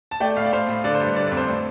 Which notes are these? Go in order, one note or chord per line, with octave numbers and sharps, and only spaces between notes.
A5
A3 D5 G5
A2 F5
D5
A2 C5 F5
A2
D3 D5
C5
G2
D3 D5
D5
F2
C5
A2